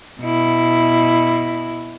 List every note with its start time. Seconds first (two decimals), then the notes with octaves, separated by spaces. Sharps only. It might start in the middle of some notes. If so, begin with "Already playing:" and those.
0.21 B2 E4